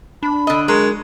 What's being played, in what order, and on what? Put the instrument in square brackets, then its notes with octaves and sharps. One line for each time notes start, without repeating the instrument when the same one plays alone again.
[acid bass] D4 [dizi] B5
[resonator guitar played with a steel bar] D3 D#5
[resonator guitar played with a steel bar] F#3 [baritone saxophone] G#3 [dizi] A#4